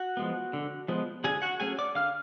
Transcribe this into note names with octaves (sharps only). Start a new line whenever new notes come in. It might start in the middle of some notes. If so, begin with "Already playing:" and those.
Already playing: F#4 F#5
F3 G#3 B3
D3
F3 G#3 B3
D3 G#4 G#5
F#4 F#5
F#3 A3 C#4 G#4 G#5
D5 D6
D3 F5 F6